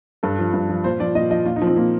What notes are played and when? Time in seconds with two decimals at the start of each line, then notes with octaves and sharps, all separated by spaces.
0.23 G2 A4
0.39 F3
0.54 G2
0.69 F3
0.84 A#2 C5
1.00 F3 D5
1.15 A#2 D#5
1.31 F3 D#5
1.45 A#2 F4
1.56 D#4
1.62 F3
1.67 C4
1.76 A#2 A#3